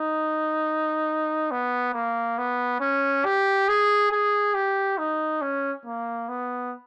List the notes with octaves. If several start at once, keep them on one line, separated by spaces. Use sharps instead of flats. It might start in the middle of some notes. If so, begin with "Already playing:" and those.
Already playing: D#4
B3
A#3
B3
C#4
G4
G#4
G#4
G4
D#4
C#4
A#3
B3